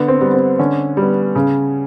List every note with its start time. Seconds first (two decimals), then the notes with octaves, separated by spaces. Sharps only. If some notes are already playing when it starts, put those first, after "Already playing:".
Already playing: D3 B3
0.08 C4
0.21 G3 B3
0.34 C4
0.59 D3 C#4
0.97 G3 B3
1.35 C#3